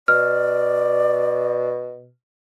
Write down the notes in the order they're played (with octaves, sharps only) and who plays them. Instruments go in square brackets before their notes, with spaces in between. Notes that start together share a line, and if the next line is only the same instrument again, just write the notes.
[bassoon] B2 [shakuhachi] D5 [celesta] F6